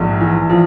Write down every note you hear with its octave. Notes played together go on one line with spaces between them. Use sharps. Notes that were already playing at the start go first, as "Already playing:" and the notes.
Already playing: A#1 G#2
E3
F3